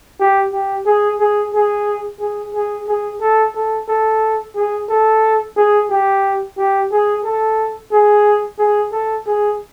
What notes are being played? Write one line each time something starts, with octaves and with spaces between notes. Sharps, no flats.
G4
G4
G#4
G#4
G#4
G#4
G#4
G#4
A4
A4
A4
G#4
A4
G#4
G4
G4
G#4
A4
G#4
G#4
A4
G#4